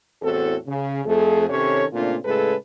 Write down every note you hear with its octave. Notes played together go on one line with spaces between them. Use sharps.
E2 A2 C4 F#4 A4
C#3
F2 A3 G#4
C3 D#3 C#4 A4 C#5
A#2 C#3 A3 C4 D4 F4
A2 C#3 G#3 G#4 A4 B4